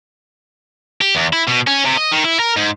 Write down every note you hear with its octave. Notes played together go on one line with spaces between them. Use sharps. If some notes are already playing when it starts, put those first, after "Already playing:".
G4
E2
E4
B2
C#4
C3
D#5
D#3
E4
A#4
G#2